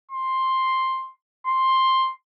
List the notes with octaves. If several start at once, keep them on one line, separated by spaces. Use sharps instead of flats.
C6
C6